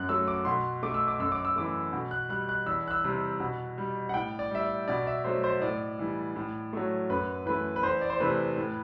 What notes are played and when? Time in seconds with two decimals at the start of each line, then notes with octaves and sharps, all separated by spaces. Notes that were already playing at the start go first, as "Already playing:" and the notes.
Already playing: F#2 F#6
0.09 F#3 A3 E6
0.28 D6
0.45 B2 C6
0.83 A3 D6
0.94 E6
1.08 D6
1.19 F#2 E6
1.32 D6
1.45 E6
1.56 E3 A3 D6
1.93 B2
2.11 F#6
2.29 G3 F#6
2.49 F#6
2.66 E2 E6
2.87 F#6
2.91 E6
3.04 C3 G3
3.40 B2
3.78 G3
4.09 F#5
4.14 A2 G5
4.39 D5
4.51 G3 E5
4.63 D5
4.88 B2 D5
5.02 D5
5.07 E5
5.24 F#3 A3 C5
5.44 C5
5.61 A2 D5
5.99 E3 G3
6.36 A2
6.73 F#3 A3
7.09 F#2 B4
7.46 E3 A3 B4
7.76 B4
7.83 E2 C5
8.01 D5
8.10 C5
8.20 C3 E3 A3 B4
8.57 A2